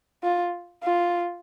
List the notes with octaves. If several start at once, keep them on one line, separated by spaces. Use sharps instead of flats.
F4
F4